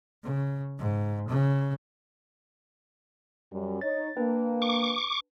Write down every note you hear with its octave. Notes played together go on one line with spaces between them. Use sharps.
C#3
G#2
C#3
F#2 G3
D#4 C#5 A6
A#3 D4 B4 G5
C#6 D6